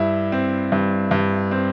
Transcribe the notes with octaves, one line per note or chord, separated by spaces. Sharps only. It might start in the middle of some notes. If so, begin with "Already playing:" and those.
Already playing: G2 E4
C4
G2
G2
C4